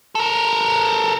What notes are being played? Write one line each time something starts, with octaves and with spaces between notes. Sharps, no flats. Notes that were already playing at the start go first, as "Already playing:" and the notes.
A4 A#4